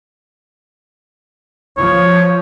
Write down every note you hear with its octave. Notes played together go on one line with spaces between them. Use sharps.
F3 C#5